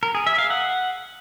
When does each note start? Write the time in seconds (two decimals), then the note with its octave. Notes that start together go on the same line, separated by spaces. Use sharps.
0.03 A#4
0.15 G#4
0.27 E5
0.38 F5
0.50 F#5